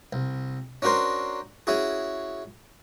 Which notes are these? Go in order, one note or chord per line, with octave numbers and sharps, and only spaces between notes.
C2
C#4 D4 F#4 A#4 C5
C#4 E4 F#4 G#4